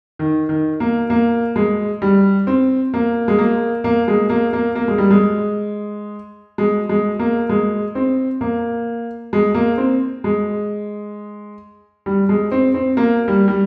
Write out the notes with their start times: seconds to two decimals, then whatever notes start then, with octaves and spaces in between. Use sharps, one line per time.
0.19 D#3
0.49 D#3
0.80 A#3
1.10 A#3
1.56 G#3
2.02 G3
2.47 C4
2.94 A#3
3.28 G#3
3.39 A#3
3.84 A#3
4.08 G#3
4.30 A#3
4.53 A#3
4.75 A#3
4.88 G#3
4.98 G3
5.11 G#3
6.58 G#3
6.89 G#3
7.19 A#3
7.49 G#3
7.95 C4
8.41 A#3
9.33 G#3
9.55 A#3
9.78 C4
10.24 G#3
12.06 G3
12.29 G#3
12.52 C4
12.74 C4
12.97 A#3
13.28 G3
13.48 G3